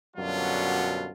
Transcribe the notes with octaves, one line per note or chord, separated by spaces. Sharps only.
F#2 B2 D3 F#3 G3 F4